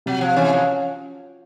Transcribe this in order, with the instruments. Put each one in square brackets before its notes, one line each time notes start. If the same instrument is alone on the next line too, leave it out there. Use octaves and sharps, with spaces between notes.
[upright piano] C3 [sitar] F#3
[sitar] F3
[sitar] E3 [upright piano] C#4
[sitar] F3